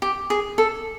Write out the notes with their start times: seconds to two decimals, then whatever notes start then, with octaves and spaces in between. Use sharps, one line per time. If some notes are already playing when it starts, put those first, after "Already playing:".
0.02 G4
0.30 G#4
0.58 A4